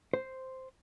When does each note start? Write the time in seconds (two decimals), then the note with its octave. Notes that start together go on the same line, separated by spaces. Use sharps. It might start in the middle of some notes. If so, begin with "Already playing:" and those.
0.14 C5